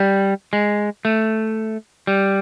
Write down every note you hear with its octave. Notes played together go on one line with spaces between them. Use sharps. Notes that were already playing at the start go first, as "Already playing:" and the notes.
Already playing: G3
G#3
A3
G3